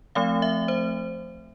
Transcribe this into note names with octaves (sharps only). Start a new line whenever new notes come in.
F3 A3 C4 F5
E5
C5